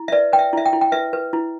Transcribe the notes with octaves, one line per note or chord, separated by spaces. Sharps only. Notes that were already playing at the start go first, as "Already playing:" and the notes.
Already playing: E4
E5
B4 D5
B4 G5
E5
E4 E5
G5
E4
G5
B4 E5
B4
E4